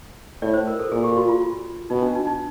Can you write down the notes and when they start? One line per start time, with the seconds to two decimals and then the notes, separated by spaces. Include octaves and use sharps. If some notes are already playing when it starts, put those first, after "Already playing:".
0.42 A2 D5
0.54 C5
0.67 A#4
0.79 A4
0.92 A#2 G#4
1.03 G4
1.17 F#4
1.28 F4
1.90 B2 D#4
2.02 D4
2.15 D#4
2.27 D#4